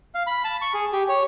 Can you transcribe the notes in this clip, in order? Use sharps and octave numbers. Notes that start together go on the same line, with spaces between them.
F5
B5
A5
C#6
G#4
G4
C#5